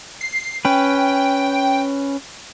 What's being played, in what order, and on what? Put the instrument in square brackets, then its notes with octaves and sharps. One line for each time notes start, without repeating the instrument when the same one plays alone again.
[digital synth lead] C7
[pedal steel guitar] C#4 B4 [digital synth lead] G5